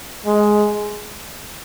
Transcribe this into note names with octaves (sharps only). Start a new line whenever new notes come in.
G#3